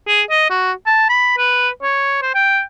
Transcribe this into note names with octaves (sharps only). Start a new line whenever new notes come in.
G#4
D#5
F#4
A5
B5
B4
C#5
C5
G5